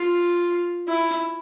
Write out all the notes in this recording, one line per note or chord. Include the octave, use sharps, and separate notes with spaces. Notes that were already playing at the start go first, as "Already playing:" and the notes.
Already playing: F4
E4